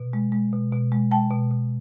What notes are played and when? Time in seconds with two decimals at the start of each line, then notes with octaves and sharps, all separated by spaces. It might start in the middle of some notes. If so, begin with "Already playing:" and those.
Already playing: B2
0.13 G#3
0.32 G#3
0.53 B2
0.72 B2
0.92 G#3
1.11 G#3 G5 A5
1.30 B2
1.51 B2